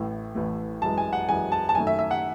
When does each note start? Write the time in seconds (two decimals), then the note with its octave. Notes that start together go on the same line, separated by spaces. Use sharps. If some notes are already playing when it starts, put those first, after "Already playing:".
Already playing: A1 A2 E3 A3
0.35 A1 A2 E3 A3
0.82 F#2 E3 G#3 A5
0.98 G#5
1.13 F#5
1.29 F#2 E3 G#3 G#5
1.52 A5
1.69 A5
1.75 F#2 D#3 A3 G#5
1.87 E5
1.99 E5
2.11 F#5